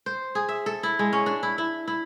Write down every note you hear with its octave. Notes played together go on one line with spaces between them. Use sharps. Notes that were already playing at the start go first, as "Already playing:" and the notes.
C5
G#4
E5
A4
E4
G#3
C#4
D4
E4
E4
E4